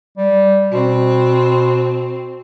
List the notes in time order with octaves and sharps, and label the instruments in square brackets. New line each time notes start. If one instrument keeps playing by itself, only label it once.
[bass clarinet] G3
[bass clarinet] B2 [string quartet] C4